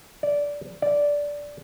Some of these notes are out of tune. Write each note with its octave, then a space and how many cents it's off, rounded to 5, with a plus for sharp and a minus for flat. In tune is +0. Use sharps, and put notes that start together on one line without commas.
D5 -15
D5 -10